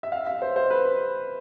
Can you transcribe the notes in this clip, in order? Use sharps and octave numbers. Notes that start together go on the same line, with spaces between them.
E5
F5
E5
C5
C5
B4